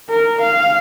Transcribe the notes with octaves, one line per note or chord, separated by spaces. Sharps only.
A#4
F5